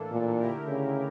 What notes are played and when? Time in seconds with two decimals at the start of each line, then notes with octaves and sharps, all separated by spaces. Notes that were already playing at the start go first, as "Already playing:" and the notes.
Already playing: A2 E3 A#3 D4 A4
0.12 A#2
0.39 D3 A3 E4 G4 A#4
0.68 C#3